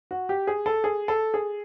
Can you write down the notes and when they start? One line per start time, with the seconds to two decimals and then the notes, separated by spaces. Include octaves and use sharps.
0.11 F#4
0.29 G4
0.47 G#4
0.66 A4
0.84 G#4
1.08 A4
1.34 G#4